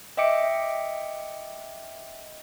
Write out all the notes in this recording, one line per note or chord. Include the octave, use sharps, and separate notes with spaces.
D#5 E5 G5 D6 C#7 D7